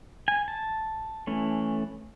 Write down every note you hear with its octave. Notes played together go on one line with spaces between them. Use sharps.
G#5
A5
E3 A3 C#4